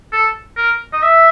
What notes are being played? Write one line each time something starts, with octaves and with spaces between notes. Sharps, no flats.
A4
A#4
D#5
E5